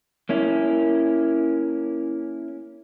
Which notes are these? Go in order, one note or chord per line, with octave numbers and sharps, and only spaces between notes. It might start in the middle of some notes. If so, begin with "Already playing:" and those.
A#3 C#4 E4